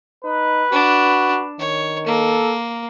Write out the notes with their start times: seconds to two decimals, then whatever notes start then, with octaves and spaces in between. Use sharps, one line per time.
0.25 D#4 B4
0.72 D4 F#4
1.59 D#3 C#5
2.07 A#3 A4